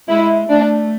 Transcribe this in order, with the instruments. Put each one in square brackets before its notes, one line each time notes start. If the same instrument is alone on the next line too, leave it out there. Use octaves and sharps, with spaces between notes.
[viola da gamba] G#3 [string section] E4
[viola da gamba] A3 [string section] D4